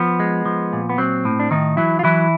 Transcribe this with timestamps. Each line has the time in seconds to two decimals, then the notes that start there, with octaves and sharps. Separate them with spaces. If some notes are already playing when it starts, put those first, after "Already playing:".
Already playing: F3 B3
0.20 G#3
0.45 F3
0.73 A#2
0.89 B3
0.98 F#3 C4
1.25 A2
1.40 D4
1.51 A2 D#3 D#4
1.77 E3 F#3 E4
1.99 F4
2.03 E3 F#3 E4